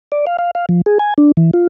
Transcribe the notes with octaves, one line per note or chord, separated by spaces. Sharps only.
D5
F5
F5
F5
F3
G#4
G#5
D4
E3
F4